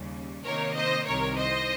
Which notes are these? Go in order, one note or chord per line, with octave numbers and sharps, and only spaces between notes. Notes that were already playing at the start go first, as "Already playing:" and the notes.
Already playing: D#2 C#3 G3
C3 D#3 A#3 D#4 A#4 C#5
C5 D#5
C2 C3 D#3 A#4 C#5
C5 D#5